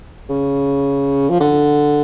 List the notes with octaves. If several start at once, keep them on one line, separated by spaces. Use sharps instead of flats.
C#3
F3
D3